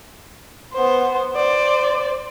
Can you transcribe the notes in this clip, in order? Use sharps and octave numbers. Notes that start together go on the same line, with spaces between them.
B3 C5
C5 D5